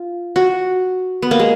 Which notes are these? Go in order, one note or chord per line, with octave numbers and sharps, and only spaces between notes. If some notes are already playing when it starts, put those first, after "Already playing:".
Already playing: F4
F#4
B3
A#3
G#3